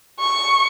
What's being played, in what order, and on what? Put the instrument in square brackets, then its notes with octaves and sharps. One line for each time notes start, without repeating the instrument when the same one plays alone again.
[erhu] C#6